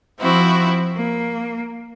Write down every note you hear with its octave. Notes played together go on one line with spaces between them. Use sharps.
F3 C4 E4 F#4
A#3